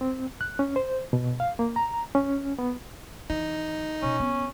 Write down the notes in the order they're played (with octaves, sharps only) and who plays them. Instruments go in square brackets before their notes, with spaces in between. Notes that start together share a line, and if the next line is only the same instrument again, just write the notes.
[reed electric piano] C4
F#6
C#4
C5
B2
F5
A#3
A#5
C#4
B3
[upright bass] E3 [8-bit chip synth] D#4
[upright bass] B2 [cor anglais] C#4
[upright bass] B3